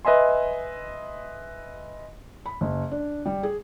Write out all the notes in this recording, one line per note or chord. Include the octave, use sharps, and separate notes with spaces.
B4 D#5 E5 G#5 C6
B5
F#1
D4
G3
G#4